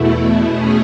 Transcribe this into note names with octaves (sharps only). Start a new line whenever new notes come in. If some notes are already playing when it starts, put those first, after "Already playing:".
Already playing: E2 B2 A3 E4
B2 A3 C#4 G#4